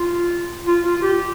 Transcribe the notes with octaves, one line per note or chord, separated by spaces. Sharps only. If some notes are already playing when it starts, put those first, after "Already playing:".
Already playing: F4
F4
F4
G4